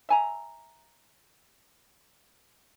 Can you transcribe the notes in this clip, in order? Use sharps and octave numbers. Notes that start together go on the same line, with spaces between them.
E5 G#5 A#5